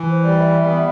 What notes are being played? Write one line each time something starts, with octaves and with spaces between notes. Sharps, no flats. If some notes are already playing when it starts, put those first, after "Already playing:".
Already playing: E3
C5
G3
E5
B3